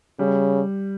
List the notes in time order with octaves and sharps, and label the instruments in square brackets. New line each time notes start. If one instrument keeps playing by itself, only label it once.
[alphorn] C#3 [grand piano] G3